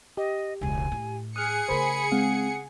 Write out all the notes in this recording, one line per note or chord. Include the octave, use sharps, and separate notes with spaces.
G4 D#5
E1 C#2 G#5
A2
G#4 D#6 F6 F#6 C#7
C#3 A3 A#4 C5 B5
G#3 C4 F5 F#5